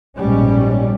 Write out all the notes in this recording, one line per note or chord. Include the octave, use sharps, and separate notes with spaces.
A#1 G#2 B2 G3 C#4